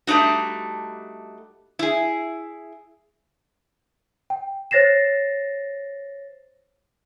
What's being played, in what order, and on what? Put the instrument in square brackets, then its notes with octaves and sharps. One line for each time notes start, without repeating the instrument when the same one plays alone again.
[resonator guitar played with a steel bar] G3 A3 D4 D#4 F#4
E4 G#4
[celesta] G5
C5 C#5 A6 A#6 C7 E7